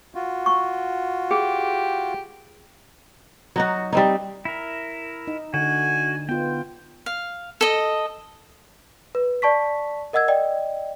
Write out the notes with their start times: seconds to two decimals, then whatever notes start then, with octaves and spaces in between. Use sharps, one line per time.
0.15 F4 F#4
0.46 C#6
1.31 G4 G#4
3.56 F#3 D#4 F#4
3.93 G3 C4 D#4
4.45 E4 A#4
5.28 D#4
5.54 D3 F#4 G#5
6.29 B3 F4 G5
7.06 F5
7.61 A4 D#5
9.15 B4
9.42 D5 A5 C#6 B6
10.13 A#4 D#5 F#5 E6 G#6
10.28 D5 D#5 G5